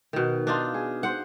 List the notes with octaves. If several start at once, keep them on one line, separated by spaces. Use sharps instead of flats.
B2 D#3
D4 D#4 F4
G#4
C5 F#5